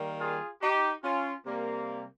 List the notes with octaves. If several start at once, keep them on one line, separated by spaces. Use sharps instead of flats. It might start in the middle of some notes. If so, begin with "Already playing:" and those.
Already playing: D#3 G3 A#3
F4 G#4
D#4 G4
C#4 F4
C3 G3 A#3